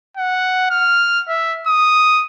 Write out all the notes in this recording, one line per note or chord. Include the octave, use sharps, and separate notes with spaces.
F#5
F6
E5
D#6